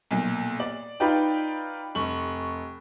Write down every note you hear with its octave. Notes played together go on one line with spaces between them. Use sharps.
B1 A#2
D5
D#4 F4 B4 D5 G5
F1 C#6 F#7